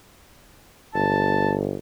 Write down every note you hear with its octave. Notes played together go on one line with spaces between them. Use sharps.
G1 A5